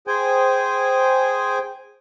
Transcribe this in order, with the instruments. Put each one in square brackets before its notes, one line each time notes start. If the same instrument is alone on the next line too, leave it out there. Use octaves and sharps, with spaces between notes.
[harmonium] G#4 C5 G5 G#5